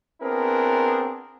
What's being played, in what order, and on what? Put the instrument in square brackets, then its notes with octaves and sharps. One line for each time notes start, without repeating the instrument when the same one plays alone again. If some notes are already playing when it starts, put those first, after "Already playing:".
[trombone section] B3 C4 D4 E4 G#4 A#4